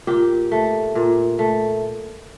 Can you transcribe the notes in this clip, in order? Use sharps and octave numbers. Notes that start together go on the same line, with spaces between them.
A#2 G4
A3
A#2
A3